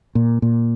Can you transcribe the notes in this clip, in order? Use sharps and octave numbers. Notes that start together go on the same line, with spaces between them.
A#2
A#2